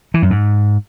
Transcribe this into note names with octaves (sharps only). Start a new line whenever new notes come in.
E3
F#2
G#2